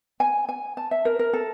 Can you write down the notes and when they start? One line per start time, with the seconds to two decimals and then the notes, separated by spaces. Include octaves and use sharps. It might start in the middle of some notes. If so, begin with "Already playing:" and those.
0.20 G#5
0.49 G#5
0.77 A5
0.91 E5
1.05 A#4
1.19 A#4
1.33 A4